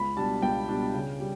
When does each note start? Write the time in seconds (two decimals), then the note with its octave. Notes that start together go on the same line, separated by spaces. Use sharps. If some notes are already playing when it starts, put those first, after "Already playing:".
Already playing: C#2 B5
0.17 B2 G3 D4 A5
0.42 C#2 G5
0.69 B2 G3 D4
0.95 C#3
1.20 G3